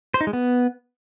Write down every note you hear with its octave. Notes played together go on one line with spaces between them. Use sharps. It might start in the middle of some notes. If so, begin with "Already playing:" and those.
C5
D#4
G#3
B3